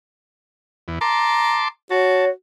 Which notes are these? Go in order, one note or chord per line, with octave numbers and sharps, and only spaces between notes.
E2
A5 A#5 C6 D6
F#4 C#5 A5